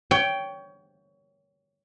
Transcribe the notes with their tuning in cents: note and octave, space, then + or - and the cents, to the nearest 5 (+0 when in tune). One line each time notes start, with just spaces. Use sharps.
C#5 +25 G5 +0